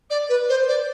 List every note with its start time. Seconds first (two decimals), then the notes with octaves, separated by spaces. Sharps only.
0.10 D5
0.29 B4
0.49 C5
0.67 D5